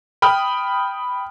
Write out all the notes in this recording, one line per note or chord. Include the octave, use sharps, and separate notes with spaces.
G5 B5 D#6 F6